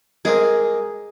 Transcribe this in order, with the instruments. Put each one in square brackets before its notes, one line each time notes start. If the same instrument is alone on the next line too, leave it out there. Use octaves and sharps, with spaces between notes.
[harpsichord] G#3 A#3 C4 [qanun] G#4